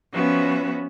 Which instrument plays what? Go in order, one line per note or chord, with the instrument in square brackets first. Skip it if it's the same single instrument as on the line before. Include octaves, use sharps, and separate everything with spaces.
[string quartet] F3 B3 C#4 F#4 B4 E5